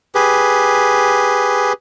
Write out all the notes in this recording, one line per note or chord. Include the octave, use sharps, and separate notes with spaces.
G4 G#4 B4